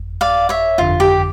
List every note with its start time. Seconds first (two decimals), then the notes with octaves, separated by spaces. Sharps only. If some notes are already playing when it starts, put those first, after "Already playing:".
Already playing: G1 F2
0.21 D5 F5
0.49 C#5 E5
0.78 G1 F2 D3 F4
1.00 G4